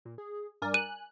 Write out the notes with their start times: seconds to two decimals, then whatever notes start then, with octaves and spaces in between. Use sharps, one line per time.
0.05 A#2
0.18 G#4
0.62 G2 A#4 D5 G#5
0.74 F#6 D#7